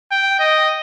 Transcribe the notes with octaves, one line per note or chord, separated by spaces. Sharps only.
G5
D#5